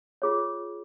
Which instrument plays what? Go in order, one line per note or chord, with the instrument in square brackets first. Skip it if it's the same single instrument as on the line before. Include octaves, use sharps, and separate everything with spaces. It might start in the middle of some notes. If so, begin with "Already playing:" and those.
[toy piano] F4 G#4 C#5